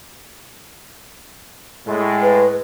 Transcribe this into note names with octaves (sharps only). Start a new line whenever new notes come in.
A2 G#3
B4